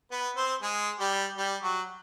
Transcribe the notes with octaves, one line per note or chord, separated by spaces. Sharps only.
B3 B4
C4 C5
G#3 G#4
G3 G4
G3 G4
F#3 F#4